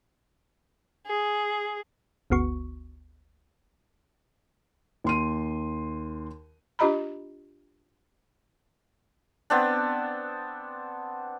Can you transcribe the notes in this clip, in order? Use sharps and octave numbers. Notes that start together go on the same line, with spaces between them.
G#4
G1 D2 B3 F#4 C#6
D#2 C6 D#7
D4 F4 G4 D#5 A#5 B5
B3 C4 D4